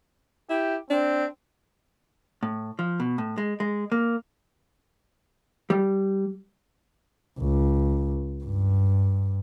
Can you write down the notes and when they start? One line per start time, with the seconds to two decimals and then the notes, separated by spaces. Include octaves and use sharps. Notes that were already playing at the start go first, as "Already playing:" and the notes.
0.50 E4 G4
0.90 C4 D4
2.43 A2
2.79 F3
3.00 B2
3.18 A2
3.38 G#3
3.60 G#3
3.92 A#3
5.70 G3
7.40 C#2
8.44 G2